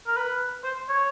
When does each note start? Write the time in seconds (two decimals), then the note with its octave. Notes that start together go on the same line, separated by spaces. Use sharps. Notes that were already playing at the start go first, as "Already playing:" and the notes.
0.07 A#4
0.17 B4
0.64 C5
0.89 C#5